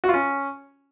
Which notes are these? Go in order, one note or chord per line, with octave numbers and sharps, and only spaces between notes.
F#4
F4
C#4